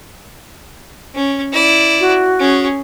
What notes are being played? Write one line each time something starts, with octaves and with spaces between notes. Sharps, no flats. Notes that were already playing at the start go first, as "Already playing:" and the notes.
C#4
E4 D5
F#4
C#4 G#4